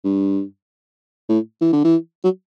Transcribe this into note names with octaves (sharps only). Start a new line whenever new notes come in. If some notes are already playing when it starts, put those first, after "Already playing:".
G2
A2
E3
D3
E3
F#3